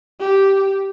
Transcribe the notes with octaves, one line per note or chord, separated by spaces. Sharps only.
G4